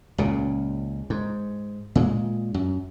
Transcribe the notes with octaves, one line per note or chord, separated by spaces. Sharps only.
C#2 A#2 C#3
G#2
A#2 G#3
F#2